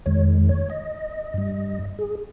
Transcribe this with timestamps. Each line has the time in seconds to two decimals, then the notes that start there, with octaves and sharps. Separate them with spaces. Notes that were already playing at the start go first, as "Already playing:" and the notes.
0.06 F2 D#3 G#3 C#5
0.49 C#5
0.70 D#5
1.34 G2 G3
1.99 G#4